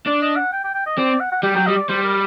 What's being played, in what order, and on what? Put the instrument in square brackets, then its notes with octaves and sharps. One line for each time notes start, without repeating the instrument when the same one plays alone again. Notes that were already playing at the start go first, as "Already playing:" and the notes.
[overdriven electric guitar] D4 [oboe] D5
[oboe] D#5
F#5
G5
G5
G5
D#5
[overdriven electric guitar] C4 [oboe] D5
[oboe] F#5
F#5
[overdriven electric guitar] G3 [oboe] G5
[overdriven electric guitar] F#3 [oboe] G5
[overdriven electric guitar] G3 [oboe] D#5
[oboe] D5
[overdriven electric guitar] G3 [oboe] C5
[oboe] A#4